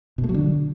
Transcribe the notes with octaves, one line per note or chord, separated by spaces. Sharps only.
B2
A3
F#3
D3